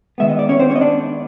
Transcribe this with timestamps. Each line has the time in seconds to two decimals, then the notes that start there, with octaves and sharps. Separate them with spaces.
0.18 D#3 G#3 B3 E5
0.29 D#5
0.39 D5
0.49 C#4 C#5
0.60 C4 C5
0.70 C#4 C#5
0.76 D#5
0.81 D4 D5